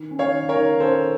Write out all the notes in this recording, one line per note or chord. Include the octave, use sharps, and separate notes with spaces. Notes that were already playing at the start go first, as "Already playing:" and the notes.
Already playing: D#3
C#4
C#5 F5
D#3
A#4 C#5
D#3
C#4 A4 C5